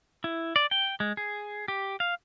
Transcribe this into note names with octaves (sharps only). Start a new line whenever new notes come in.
E4
D5
G5
G#3
G#4
G4
F5